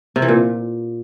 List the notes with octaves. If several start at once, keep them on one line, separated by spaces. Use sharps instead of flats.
C3
E3
A#2